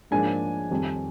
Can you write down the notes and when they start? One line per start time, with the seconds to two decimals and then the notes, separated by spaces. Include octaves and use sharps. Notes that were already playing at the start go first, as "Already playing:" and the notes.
0.11 G#2 F3 A#3 D4 G#5
0.70 F2 D#3 G3